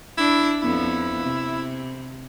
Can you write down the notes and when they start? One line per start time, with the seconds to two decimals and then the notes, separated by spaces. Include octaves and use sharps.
0.18 D4 E4
0.62 F2 B3 E4
1.23 C3